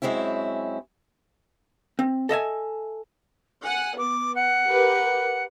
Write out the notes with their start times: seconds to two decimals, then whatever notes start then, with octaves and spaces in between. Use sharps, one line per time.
0.02 F#2 G#3 C4 C#4 E4
1.99 C4
2.29 A4 D#5 E5 G#5
3.63 F#5 G#5
3.97 B3 D6
4.35 F#5
4.66 G4 A#4 B4